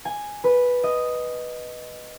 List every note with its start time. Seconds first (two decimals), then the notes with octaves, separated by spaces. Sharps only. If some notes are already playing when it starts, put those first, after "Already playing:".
0.05 G#5
0.44 B4
0.83 D#5